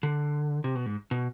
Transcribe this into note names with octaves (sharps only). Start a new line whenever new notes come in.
D3
C3
B2
G#2
B2